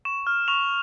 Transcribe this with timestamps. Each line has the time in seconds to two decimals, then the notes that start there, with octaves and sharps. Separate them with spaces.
0.05 C#6 E7
0.27 F6
0.48 C#6 F7